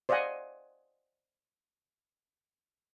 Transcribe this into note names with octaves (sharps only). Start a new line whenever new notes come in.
C5 D5 D#5 F5 F#5 G#5